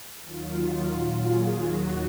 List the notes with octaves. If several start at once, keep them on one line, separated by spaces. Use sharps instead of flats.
D#2 D#3 F#3 F4
F4
A#2 F#3
G#4
D#2 D#3 F#3 F#4